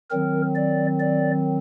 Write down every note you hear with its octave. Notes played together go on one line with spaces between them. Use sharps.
D#3 F#3 C4 A#4
D5
D5